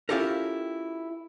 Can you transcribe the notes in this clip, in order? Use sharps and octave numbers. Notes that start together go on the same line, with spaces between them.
C#4 E4 F4 G4 A4 A#4